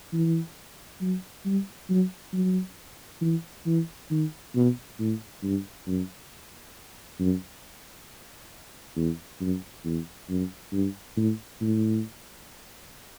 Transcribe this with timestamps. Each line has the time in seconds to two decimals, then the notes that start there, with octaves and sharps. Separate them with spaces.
0.13 E3
1.01 F#3
1.45 G3
1.89 F#3
2.33 F#3
3.21 E3
3.66 E3
4.11 D#3
4.55 B2
4.99 A2
5.43 G2
5.87 F#2
7.20 F#2
8.96 E2
9.41 F#2
9.85 E2
10.29 F#2
10.73 G2
11.17 A2
11.61 A2